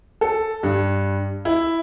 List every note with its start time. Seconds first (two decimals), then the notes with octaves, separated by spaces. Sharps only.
0.21 A4
0.63 G2
1.45 E4